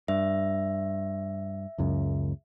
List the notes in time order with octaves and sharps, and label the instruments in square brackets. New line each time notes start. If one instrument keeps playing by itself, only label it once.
[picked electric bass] G2 [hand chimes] E5
[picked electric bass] F#1 C#2 F#2